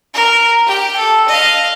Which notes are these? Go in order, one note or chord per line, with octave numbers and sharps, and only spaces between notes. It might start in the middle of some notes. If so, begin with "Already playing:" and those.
A#4
G4 G5
A4
D#5 F5